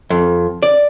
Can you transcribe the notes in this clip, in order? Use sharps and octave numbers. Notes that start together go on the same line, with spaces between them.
F2
D5